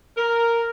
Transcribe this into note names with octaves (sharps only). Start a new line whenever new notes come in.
A#4